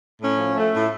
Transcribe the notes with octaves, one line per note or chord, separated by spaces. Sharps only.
A2 C#4
F3
A3
A2